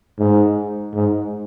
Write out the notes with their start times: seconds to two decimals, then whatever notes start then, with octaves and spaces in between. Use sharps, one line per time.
0.19 G#2
0.94 G#2